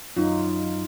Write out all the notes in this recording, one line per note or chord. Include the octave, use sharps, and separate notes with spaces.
F#2 D#4 F4